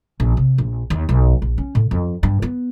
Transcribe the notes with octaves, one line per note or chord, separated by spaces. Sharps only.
A#1
C3
A#1
D#2
B1
A#1
C#4
A2
F2
G2
B3